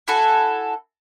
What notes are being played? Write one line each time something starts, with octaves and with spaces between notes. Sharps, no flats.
E4 F#4 A4 G#5